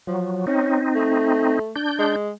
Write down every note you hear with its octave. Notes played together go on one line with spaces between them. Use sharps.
F3 F#3
C4 C#4 D#4
A3
D4 G6
G#3